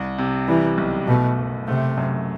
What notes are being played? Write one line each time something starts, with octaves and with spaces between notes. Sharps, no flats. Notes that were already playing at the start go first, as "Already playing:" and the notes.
Already playing: C2
C3
E3 G3
B1
B2 A3
F#1
C3 A3
F#2